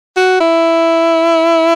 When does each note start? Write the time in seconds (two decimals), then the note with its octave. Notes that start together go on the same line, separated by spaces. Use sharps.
0.16 F#4
0.40 E4